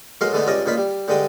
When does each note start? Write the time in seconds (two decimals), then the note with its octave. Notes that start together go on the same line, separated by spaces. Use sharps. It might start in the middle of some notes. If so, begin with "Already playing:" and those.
0.21 B1 F#3 G#3 A#4 F5 C6
0.33 D3 E3 G#3 A3 B3 D#4
0.47 C#2 G2 C#4 D5 D#5 A#5
0.66 C#2 A#2 D#4 F4 B5
0.78 G3
1.08 G2 D3 G#3 D#4 D#5 G5